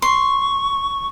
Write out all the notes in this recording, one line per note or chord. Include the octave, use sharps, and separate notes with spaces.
C6 C#6